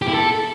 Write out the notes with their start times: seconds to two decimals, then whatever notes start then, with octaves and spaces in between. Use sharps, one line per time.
0.02 G4
0.08 E4
0.14 A4